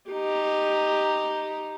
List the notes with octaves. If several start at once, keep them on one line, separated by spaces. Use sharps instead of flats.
D#4 G4